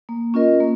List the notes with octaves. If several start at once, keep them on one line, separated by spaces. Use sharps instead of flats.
A#3
C#4 F4 A#4 D#5
A#3